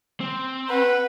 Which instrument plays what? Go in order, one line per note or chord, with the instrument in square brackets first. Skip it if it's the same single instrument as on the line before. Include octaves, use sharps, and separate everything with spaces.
[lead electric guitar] C4
[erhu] B4 [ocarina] F#5